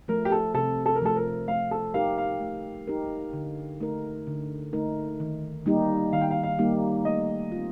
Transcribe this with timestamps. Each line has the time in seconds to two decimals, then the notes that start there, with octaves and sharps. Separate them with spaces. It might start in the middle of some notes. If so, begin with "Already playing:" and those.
0.08 F3 A3 A#4
0.25 G4
0.32 A4
0.54 C3 A4
0.86 A4
0.96 A#4
1.02 F3 A3 A4
1.16 A#4
1.48 A3 F5
1.71 A4
1.94 D#4 G4 A#4 F5
2.18 F5
2.41 A3
2.88 D#4 G4 A#4
3.33 D3
3.80 A3 D#4 A#4
4.27 D3
4.73 A3 D#4 A#4
5.20 D#3
5.66 G3 A#3 D#4 G4
6.13 D#3 F5
6.21 G5
6.31 F5
6.43 F5
6.59 G3 A#3 D#4 G4
7.05 A3 D#5
7.52 C4 F4